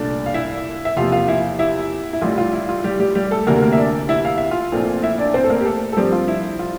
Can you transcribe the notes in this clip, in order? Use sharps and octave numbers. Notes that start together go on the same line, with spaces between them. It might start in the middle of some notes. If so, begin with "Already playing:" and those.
Already playing: C2 A#2 A3 D4 D5
F5
E4 E5
E5
E2 C3 F3 A#3 F4 F5
F4 F5
E4 E5
E4 E5
E4
A1 A2 G3 F4
F4
E4
F4
G3 G4
G3 G4
G3 G4
A3 A4
D2 C3 E3 A#3 D4 A#4
A#3 A#4
E5
D4 D5
E4 E5
F5
E5
F4 F5
A#1 A#2 A3 C4
E4 E5
D4 D5
C4 C5
A4
A#3 A#4
G4
A3 A4
A4
G2 F3 G3 C4 G4
F4
E4
F4